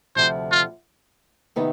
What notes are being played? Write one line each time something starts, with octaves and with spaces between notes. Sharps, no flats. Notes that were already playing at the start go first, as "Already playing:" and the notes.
D2 C3 F3 C5
F4
C3 D#3 B3 D#4 B4